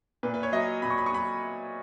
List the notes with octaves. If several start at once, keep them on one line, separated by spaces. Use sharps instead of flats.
A#2 B4
B4
C#5
F#3 D#5
A#2 B5
C#6
B5
C#6
F#3 B5